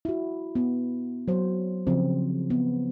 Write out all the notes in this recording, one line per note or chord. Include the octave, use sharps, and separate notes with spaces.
E4 F#4
B3
F#3 C5
C#3 F3 C4
B3